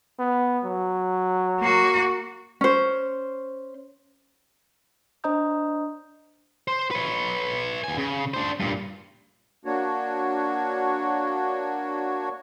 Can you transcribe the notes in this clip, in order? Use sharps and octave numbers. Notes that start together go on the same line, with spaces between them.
B3
F#3
A#3 F#4
C#4 C5
D4 C5 D#5 A#5 D#6 G6
C5
B4 C#5
D#2 G#5
C#3
D4 C5
G2 A#2
A#3 D4 F#4 C#5